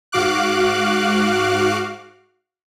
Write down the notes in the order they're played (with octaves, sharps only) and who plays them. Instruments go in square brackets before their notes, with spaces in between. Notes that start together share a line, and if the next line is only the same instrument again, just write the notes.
[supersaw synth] G#2 F#4 F5 D6 F#6